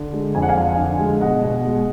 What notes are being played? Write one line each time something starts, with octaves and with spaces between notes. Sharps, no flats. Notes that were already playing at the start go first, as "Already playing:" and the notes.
Already playing: D3
G#3
F2 G#5
F#5
F5 G#5
F3
D3
G#3
B2 D#5 F#5
B2
G#3